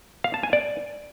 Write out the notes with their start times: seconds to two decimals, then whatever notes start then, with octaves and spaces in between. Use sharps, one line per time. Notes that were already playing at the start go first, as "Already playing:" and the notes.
0.24 F5
0.34 A5
0.43 G#5
0.53 D5